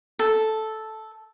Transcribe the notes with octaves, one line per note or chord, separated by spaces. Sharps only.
A4